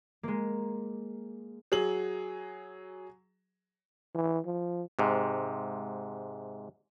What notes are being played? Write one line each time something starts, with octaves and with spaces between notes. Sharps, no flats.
G#3 A#3
F#3 G#4 F#7
E3
F3
G#2 C3